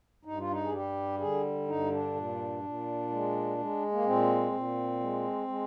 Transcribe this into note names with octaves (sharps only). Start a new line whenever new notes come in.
G2 D#4
F4
D#4
G#4
G3 G4
D3 G#4
G2 D#4
D4
A#2
A#2
G#3
G#3
A#3
A#2 C4
A#2
G#3
G#3